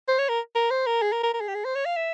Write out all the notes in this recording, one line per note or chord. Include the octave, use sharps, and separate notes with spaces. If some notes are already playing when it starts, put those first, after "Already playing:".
C5
C#5
A#4
A#4
C5
A#4
G#4
A#4
A#4
A#4
G#4
G4
G#4
C5
C#5
F5
E5